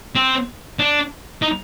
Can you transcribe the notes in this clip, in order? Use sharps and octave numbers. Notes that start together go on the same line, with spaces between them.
C4
D4
D#4